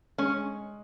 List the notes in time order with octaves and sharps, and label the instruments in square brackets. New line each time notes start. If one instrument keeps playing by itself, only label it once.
[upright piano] G#3 [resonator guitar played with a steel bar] C#4